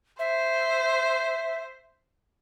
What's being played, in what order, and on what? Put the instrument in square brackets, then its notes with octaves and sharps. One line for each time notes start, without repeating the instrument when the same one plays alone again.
[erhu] C5 [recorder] E5